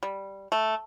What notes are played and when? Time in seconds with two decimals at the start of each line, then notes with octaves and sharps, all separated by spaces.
0.03 G3
0.52 A3